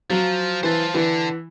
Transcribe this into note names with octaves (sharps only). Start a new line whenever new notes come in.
F3 F#3
E3 C5 A5
D3 E3